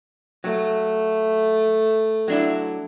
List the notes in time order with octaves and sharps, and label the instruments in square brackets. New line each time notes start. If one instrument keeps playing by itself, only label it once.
[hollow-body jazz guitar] F#3 [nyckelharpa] A3
[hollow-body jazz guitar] F#3 D4 E4